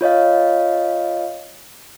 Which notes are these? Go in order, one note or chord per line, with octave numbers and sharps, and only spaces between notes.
F4 C#5 D#5 F5